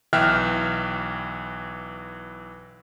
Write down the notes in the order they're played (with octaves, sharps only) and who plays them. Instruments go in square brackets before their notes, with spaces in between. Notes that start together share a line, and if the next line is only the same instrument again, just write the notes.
[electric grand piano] B1 E3 E5 G5 F6 F#6